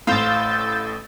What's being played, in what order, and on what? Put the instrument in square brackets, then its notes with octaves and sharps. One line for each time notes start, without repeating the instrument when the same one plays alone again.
[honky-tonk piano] A1 A2 [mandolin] C5 F5 [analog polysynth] E6 G6 A6